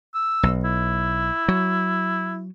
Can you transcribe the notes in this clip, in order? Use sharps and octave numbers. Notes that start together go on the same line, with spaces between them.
E6
B1
E4
F#3